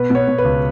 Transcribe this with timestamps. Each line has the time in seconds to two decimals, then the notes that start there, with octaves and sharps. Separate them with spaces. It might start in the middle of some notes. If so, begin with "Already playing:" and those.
Already playing: B2 B4
0.10 B2 C#5
0.28 B2
0.38 B4
0.44 C#2